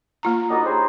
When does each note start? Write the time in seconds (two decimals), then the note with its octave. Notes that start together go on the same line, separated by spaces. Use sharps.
0.23 A#3 F4 A#5
0.50 D4 D#4 F#4 A4 B4 D#5
0.66 G4 G#4 C5 C#5